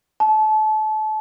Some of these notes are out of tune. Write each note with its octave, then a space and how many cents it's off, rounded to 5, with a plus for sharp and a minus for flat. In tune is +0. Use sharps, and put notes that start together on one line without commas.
A5 -30